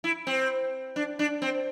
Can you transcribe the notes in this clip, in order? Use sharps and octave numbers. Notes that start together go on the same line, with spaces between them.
E4
C4
D4
D4
C4